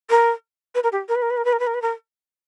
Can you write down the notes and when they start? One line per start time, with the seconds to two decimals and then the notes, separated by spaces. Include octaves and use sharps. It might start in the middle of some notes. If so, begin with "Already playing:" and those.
0.10 A#4
0.75 B4
0.83 A#4
0.92 G4
1.08 A#4
1.15 B4
1.22 A#4
1.30 B4
1.37 A#4
1.45 B4
1.53 A#4
1.59 B4
1.67 A#4
1.74 B4
1.82 A#4